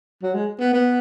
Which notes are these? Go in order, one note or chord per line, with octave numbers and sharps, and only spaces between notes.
F#3
G#3
B3
B3